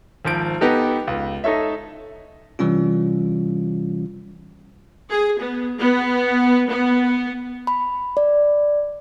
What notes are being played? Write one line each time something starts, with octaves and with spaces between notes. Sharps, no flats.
G#1 F3 D7
B3 D#4 G4 A4
C#2
D#4 A4 C#5 E5
C3 E3 G3 C#4 F4
G#4
B3
B3
B3
B5
D5